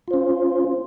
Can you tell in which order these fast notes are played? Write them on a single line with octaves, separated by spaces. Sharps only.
F4 C5 C#4